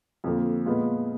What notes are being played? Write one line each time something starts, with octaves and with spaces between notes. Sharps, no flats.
F2 D3 F3 A#3
A#2 G#3 B3 F4